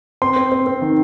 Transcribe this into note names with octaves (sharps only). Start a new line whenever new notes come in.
C4 C6
C4
C4
C4
D#3